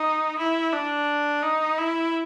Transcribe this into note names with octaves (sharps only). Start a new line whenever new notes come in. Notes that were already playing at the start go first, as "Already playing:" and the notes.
Already playing: D#4
E4
D4
D#4
E4